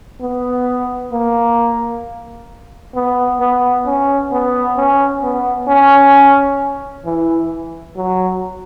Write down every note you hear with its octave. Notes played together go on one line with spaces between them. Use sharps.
B3
A#3
B3
B3
C#4
B3
C#4
B3
C#4
E3
F#3